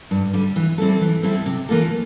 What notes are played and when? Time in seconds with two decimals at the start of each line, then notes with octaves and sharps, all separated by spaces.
0.11 G2
0.33 D3 G3
0.56 E3
0.78 G3 C4 E4 A4
1.01 E3
1.23 G3 C4 E4 A4
1.46 C3
1.69 E3 A#3 F4 A4